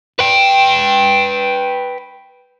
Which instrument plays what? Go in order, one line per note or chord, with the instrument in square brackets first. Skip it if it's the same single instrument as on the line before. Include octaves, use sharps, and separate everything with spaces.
[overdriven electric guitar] B4 G5